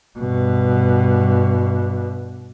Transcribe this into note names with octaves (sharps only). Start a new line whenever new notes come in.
G2 B2